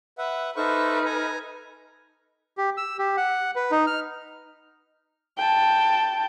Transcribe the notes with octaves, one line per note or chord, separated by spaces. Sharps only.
B4 E5 F#5
D#4 A4 B4 C5 E5 C#6 F6
G#5 A#5
G4
E6
G4
F#5
B4
D#4
F6
G5 A5